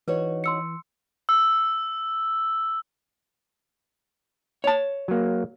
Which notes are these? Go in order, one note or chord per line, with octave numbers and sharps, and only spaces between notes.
E3 D#4 F#4 B4 C#5
C6 E6 C#7
E6
C#5 A5
F#3 A#3